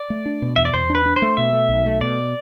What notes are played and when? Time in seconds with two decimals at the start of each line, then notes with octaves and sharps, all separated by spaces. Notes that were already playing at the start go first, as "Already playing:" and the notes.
Already playing: D5
0.10 A3
0.26 D4
0.42 B2
0.56 E2 E5
0.65 D5
0.74 E2 C5
0.90 D4
0.95 B4
1.06 D4
1.16 C5
1.22 A3
1.37 B2 E5
1.53 A3
1.69 B1
1.86 A3
2.01 B2 D5